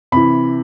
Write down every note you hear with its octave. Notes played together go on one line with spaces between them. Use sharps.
C3 E3 B5